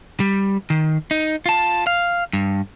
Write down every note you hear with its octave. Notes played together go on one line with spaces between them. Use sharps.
G3
D#3
D#4
F4 A5
F5
G2